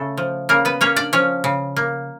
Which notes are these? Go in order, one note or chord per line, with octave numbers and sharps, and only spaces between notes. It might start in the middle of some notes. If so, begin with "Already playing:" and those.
Already playing: C#3 A3 A4
F3
C#3 A#3 A#4
B3 B4
A#3 C#4 C#5
D4 D5
F3 C#4 C#5
C#3
A#3